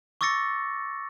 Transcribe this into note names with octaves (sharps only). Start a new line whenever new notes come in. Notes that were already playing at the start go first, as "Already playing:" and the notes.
C#6 D6 E6 A6 A#6 C#7